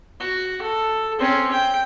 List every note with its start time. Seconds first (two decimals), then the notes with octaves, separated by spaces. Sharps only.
0.20 F#4
0.62 A4
1.19 C4 C#4
1.51 G5